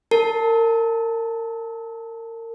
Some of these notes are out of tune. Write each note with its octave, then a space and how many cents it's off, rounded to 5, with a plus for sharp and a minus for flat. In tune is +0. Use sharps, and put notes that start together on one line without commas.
A#4 -30 A5 +0